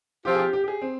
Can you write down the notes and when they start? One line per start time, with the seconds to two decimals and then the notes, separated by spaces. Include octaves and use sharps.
0.25 F3 C4 F4 G4
0.35 G#4
0.39 G4
0.53 G4
0.64 G4
0.68 G#4
0.82 C4